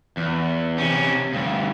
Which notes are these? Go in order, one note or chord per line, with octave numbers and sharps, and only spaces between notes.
E2
C3 C#4
D2 G2